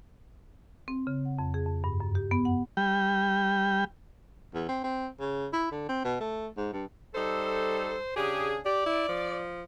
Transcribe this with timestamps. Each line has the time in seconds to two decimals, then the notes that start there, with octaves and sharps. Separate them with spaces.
0.88 C4
1.07 C#3
1.25 F#5
1.39 F2
1.54 G#4
1.66 F2
1.84 G2
2.00 F#2
2.15 G4
2.31 B3
2.45 F#5
2.77 G3 G5
4.54 E2
4.68 C4
4.84 C4
5.20 C#3
5.53 E4
5.71 D3
5.89 C4
6.04 B2
6.20 A3
6.57 G#2
6.72 G2
7.14 G3 D#4 A4 C5
8.16 C#3 D4 G4 G#4
8.65 G4 D5
8.86 E4
9.08 F3